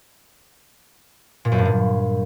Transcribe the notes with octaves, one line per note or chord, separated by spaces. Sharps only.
A#2
F#2
G2
A#2